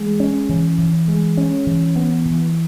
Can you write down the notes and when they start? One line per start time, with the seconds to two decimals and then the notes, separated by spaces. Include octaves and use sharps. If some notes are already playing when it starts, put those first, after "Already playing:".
Already playing: E3 G#3
0.20 C#4
0.49 E3
0.78 E3
1.08 G#3
1.37 C#4
1.67 E3
1.96 B3
2.26 E3